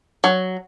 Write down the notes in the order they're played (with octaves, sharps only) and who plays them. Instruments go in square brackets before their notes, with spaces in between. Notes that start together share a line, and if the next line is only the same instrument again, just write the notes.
[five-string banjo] F#3